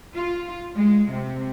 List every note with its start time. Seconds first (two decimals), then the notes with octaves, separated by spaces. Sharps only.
0.15 F4
0.76 G#3
1.11 C3